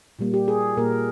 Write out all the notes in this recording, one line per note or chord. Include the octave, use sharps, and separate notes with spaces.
A#2 G3 A#3
G4
G#4
A#2 A#3 A#4